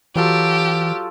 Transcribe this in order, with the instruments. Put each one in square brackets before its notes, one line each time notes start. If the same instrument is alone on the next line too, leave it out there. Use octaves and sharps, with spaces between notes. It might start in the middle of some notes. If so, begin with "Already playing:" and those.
[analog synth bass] E3 [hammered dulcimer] F#3 F4 A4 [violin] G4